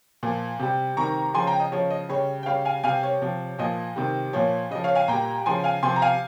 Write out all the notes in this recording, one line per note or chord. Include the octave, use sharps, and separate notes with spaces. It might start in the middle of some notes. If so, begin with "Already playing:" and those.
A#2 F3
C3 G3
C3 D#3 G3 A#5 C#6
C#3 F3 G#5 C6
G5 A#5
D#5
C#3 F3 C#5
D#5
C#3 G3 C#5
G5
C#3 G3 C#5 F5
F5 G#5
C3 G3 F5 G#5
C#5
C3 F3
A#2 F3 D#5
C3 D#3 G3
A#2 F3 C#5
C#3 F3 D#5
C#5 F5
F5 G#5
A#2 G3 G5 A#5
C#3 F3 G#5 C6
F5 G#5
C3 F3 G#5 C6
A#5
F5 G#5